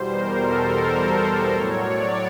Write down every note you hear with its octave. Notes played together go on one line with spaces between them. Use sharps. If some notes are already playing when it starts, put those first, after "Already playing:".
Already playing: E2 B2 G3 C5
A#4
A4
A#4
A4
A#4
A2 F#3 C#5
D5